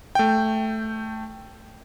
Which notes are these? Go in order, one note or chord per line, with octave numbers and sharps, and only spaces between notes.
A3 G5